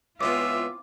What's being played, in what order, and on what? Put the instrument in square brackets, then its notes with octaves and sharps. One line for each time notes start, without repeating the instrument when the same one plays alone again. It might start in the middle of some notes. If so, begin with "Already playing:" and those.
[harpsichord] C#2 G#3 B3 [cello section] C4 E4 F4 [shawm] E5 [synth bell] D6